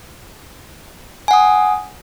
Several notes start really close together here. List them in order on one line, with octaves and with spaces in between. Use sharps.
G#5 F#5 D#6